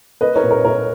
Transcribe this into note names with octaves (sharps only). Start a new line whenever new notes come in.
A#3 B4 D#5
A#4 C#5
A#2
A#4 C#5
A#2 A#4 C#5